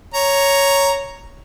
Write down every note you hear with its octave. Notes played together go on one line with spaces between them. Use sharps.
C#5 A#5